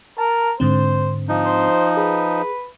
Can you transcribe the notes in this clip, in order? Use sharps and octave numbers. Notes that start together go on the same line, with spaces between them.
A#4 A5
G#2 D3 C4 C5
F3 D#4
C5
G#4 B4